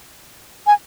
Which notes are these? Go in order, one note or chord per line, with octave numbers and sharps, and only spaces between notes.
G#5